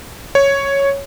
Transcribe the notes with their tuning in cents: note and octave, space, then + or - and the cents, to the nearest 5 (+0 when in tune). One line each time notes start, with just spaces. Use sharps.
C#5 +0